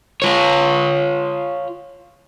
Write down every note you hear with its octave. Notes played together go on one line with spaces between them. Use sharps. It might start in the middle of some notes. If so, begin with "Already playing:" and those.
F4 C#5